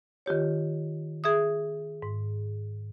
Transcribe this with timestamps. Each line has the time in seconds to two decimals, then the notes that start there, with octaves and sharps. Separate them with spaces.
0.26 D#3 F4 G4 C#5
1.24 G#4 E5 D#6
2.02 G#2